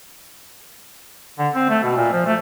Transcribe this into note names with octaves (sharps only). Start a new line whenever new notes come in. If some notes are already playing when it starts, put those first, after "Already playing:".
D3
C4
A3
B2
A#2
F3
A3